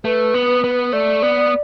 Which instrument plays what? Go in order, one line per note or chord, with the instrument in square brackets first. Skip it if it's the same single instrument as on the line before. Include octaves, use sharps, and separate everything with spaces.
[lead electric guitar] A3 [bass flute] B4
[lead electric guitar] B3
B3
[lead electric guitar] A3 [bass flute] D5
[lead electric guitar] B3